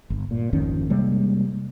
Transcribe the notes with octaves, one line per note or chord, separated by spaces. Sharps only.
G1
A#2
G#1 F2 D#3 C#4
C3 G3 G#3 A#3